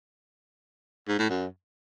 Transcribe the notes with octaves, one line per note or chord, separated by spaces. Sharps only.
G#2
A2
F#2